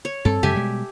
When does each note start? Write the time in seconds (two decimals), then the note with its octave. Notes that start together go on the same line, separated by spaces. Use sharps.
0.05 C#5
0.25 G2 C4 A4
0.43 F#2 C#3 G#3 G4 E5 G#5
0.55 B2 G3 G#3